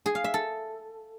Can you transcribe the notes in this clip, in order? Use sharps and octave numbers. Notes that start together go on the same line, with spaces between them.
G#4
F5
E5
A4